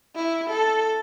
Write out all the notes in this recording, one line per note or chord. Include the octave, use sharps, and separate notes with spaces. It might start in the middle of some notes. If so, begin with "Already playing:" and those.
E4
A4